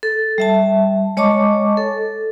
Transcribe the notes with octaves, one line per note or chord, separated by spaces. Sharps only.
A4
G3 E5 A5
G#3 C#5 D#5 A5 C#6 D6
A4